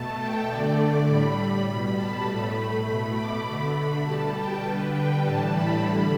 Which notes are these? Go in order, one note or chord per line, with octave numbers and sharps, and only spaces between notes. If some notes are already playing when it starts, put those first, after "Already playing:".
Already playing: B2 A3 A5
G5
D3 A3 D5
D6
A2 G3 B5
B2 G3
A5
A2 A3 B5
B2 A3
D6
D3 A3 B5
B5
B2 G3 A5
G5
D3 G3 B4
G5
A2 E3 G3 A5
B5
D3 G3 B5